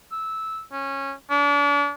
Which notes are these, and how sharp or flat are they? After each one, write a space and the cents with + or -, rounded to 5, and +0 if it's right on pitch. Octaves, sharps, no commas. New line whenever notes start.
E6 -15
C#4 -15
D4 -40